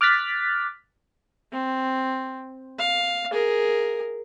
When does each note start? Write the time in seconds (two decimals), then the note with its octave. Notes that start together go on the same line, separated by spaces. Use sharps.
0.01 D6 F6 F#6 A6 B6
1.53 C4
2.78 F5
3.32 G#4 A#4